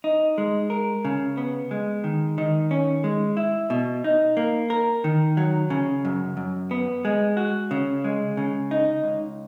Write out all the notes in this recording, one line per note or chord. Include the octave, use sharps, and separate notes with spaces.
D#4
G#3
A#4
C#3
B3
G#3
D#3
D#3
C#4
G#3
E4
B2
D#4
A#3
A#4
D#3
F#3
C#3
F#2
F#2
B3
G#3
F#4
C#3
G#3
C#3
D#4
C#2